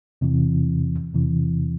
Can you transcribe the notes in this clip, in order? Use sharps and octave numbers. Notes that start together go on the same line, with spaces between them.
E2 C3 E3
E2 C3 E3